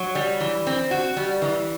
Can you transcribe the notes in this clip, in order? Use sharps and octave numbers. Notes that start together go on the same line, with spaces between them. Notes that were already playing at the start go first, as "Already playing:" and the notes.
Already playing: F#3
G3
E3
C4
F#4
G3
E3